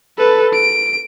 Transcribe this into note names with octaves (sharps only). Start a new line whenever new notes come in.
A4 B4
D7